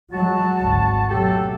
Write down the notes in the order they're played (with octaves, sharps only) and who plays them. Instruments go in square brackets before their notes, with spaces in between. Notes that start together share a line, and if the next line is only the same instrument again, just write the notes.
[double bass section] F#3 G#3 [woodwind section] F#4 A5
[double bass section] G#1 D2
[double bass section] B2 F#3 A3 [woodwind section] G4 A4